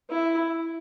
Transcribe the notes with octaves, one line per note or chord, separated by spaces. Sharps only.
E4